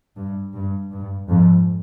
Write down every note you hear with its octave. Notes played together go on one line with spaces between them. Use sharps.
G2
G2
G2
F2 G#2